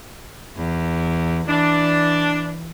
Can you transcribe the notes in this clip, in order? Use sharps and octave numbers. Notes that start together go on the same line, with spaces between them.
E2
E3 D4